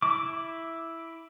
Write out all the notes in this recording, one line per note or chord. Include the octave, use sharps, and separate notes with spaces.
E4 D6